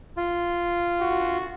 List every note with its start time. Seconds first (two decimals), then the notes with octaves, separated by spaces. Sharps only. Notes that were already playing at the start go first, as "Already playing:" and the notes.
0.17 F4
1.00 F#4